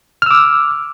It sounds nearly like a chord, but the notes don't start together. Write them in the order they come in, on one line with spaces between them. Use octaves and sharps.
F6 E6 D6